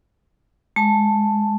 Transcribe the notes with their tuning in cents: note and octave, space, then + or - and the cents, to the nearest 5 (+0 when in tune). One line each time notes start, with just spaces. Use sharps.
G#3 +0 A5 +0